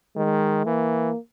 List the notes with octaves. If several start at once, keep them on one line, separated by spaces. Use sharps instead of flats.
D#3 G#3
E3 A#3